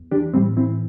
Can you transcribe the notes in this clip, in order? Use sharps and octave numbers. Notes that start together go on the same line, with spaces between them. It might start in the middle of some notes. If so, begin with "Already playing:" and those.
Already playing: E2
E3 D4 G4
A2 G3 C4
E3 C4 E4